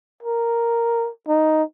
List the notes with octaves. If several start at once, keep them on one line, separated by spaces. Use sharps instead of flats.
A#4
D#4